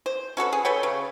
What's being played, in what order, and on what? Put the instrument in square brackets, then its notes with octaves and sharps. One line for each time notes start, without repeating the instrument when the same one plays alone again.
[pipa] C5
C#4 F#4 A4 B4
G#4
A4 B4 C#5 G5
C#3